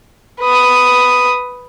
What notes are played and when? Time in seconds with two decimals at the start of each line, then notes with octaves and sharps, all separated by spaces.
0.41 B4 D#6